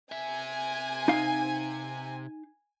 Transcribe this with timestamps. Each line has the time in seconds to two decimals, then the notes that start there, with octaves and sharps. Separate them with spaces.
0.12 C3 E5 G#5
1.08 D#4 F5